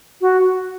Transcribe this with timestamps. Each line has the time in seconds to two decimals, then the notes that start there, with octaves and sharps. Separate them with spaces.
0.21 F#4